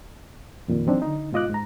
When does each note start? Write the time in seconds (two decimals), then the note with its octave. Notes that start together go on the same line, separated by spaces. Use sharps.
0.68 F2 A#2 D#3
0.86 E3 F#3 C4 D4 D#4
1.02 D3 D#4
1.32 G#2 B2 F4 D#5 D6 F#6
1.50 G#2 A#5